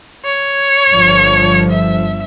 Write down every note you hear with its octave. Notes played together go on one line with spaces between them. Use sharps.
C#5
G1 F3
E5